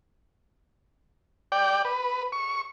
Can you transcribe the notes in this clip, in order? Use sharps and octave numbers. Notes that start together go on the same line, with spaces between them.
D5 G5
B4
C#6